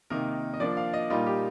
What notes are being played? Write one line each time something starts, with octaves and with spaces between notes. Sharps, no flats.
C3 D#3 A#3 D#4 A#4
D#5
F3 A#3 D4 D5
F5
D#5
A#2 G3 A#3 D#4 F4
G4